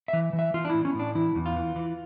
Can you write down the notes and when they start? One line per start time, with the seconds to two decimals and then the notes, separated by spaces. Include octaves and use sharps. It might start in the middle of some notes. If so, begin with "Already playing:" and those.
0.08 E3 E5
0.33 E3
0.39 E5
0.54 E3 F4
0.65 D4
0.70 A2 E4
0.85 C#4
0.94 A2
1.00 D4
1.15 E3 E4
1.35 E2
1.46 F4
1.56 E3
1.76 E3